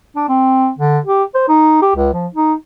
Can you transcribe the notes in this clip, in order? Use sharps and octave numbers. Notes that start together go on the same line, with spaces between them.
D4
C4
D3
G4
C5
D#4
G4
C#2
F3
D#4